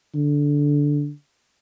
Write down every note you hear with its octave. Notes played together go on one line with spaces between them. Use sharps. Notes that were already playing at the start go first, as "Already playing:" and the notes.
D3